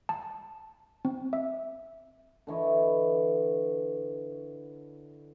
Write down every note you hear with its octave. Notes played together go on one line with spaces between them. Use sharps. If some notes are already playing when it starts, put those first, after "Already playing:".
A5
C4
E5
D3 E3 C#5 D#5